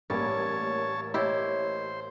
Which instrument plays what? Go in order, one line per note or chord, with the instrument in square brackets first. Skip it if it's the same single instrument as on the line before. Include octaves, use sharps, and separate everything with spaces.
[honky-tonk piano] A1 A#3 G#6 [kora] G3 [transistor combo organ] C#5 A5
[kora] E4 G4 [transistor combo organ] C5 [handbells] C#5 D#5